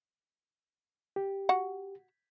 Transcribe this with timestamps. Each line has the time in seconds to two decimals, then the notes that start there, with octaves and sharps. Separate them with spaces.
1.16 G4
1.49 F#4 F#5